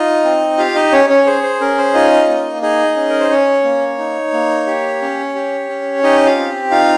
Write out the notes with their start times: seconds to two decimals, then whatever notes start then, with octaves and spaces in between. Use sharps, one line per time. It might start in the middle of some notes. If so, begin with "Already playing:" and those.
Already playing: D#4 F4 D#5
0.24 C4
0.58 F4 G4 F5
0.75 D#4 D#5
0.92 C#4 C#5
1.09 C#4 C#5
1.26 G#4 C5
1.43 C5
1.61 C#4 A#4
1.78 C5
1.94 D#4 F4 D#5
2.29 A#3
2.62 D#4 G#4 D#5
2.96 C#4
3.09 A#4
3.20 C5
3.30 C#4 C#5
3.64 A#3
3.98 D#4
4.33 A#3
4.67 G4
5.02 C#4
5.35 G4
5.69 C#4
6.03 D#4 G4 D#5
6.26 F4 F5
6.37 C4
6.71 D#4 F4 F5